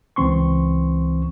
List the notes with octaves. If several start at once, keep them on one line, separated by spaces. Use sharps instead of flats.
C#2 E3 C4 C6 C#6